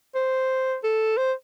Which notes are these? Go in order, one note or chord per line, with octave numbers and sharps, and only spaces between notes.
C5
A4
C5